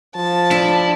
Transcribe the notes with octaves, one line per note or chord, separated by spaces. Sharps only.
F3 A5
D4 E4